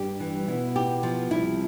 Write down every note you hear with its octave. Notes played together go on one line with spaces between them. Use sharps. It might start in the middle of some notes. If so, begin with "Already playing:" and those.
Already playing: G2 G3 G4
E3
B2 B3 E4
G4
F3
C2 C3 E4